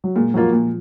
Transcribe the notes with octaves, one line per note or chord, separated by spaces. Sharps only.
F#3
A#2 G#3
F3 F#3 A#3 F4
A#2